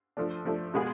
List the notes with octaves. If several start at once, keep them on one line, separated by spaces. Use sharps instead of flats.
F3 A3 D4
F3 A3 D4
B2 G#3 B3 F4 G#4